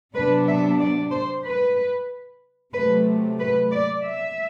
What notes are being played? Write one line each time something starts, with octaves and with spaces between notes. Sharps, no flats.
C3 F#3 B3 D4 B4
E5
D5
C5
B4
C3 F#3 A3 B4
B4
D5
E5